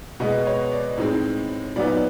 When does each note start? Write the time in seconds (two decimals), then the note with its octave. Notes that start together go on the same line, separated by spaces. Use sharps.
0.20 B2 G#3 B3 D#5
0.47 C#5
0.72 D5
0.98 A2 E3 G#3 C4 D#4
1.76 A#2 F#3 B3 D#4 D5